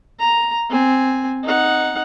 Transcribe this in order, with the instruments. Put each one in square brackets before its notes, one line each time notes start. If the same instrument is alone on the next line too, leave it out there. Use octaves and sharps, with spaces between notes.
[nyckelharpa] A#5
C4 G#5
D#4 F#5